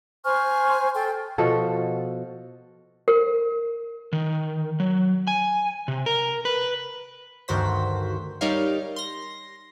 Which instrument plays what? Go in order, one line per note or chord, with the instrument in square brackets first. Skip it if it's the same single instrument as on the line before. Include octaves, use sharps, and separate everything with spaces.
[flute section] C5 G#5 C#6 F6
A4 G5
[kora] B2 F3 F#4 A4
[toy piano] A#4
[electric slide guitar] D#3
F#3
G#5
C3
A#4
B4
[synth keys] D2 G2 D#3 F#4 C5 B6
G3 D#4 A#4 C#5 F5
C6 A#6